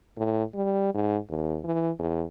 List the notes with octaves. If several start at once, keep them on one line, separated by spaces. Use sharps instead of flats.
A2
G3
G#2
D#2
E3
E2